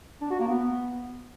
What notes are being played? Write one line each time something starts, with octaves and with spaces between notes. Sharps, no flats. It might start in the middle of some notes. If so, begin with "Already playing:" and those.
D4
F#4
A#3
B3